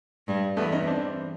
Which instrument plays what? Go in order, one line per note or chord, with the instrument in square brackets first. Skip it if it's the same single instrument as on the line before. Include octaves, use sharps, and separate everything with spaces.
[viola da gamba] G2 G3
[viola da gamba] E2 E3 [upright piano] A3 B3
[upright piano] C#4 D#4
C4 D4